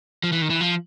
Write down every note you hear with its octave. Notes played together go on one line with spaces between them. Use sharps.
F3
E3
D#3
E3
F3